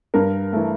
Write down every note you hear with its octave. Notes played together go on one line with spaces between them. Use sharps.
G2 A#4
E3 A3